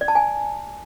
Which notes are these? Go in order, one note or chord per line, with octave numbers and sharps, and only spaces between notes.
D5
A5
G#5